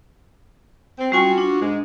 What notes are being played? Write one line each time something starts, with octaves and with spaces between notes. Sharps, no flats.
C4
G3 C#4 F4 F#4 G#5
D4
G#2 G#3